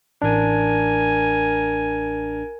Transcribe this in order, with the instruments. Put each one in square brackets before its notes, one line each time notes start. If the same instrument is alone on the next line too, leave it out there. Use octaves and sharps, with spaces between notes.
[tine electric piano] A1 D4 [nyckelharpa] A#4 G#5